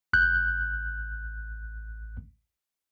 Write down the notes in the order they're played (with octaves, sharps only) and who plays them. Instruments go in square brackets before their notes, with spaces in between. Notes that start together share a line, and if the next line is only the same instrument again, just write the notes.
[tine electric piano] A1 F#6 G6